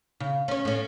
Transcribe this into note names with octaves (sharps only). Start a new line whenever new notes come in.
C#3
C#4 C#5
A2 C#4